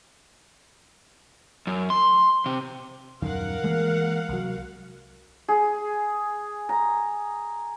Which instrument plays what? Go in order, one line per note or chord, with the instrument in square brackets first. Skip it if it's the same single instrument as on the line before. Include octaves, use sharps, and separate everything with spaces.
[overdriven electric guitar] F#2
C6
C3
[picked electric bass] D#1 F#2 D#3 [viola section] A#4 F5 F#5
[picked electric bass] E3 G#3 A#3
C2 F#3
[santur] G#4
A#5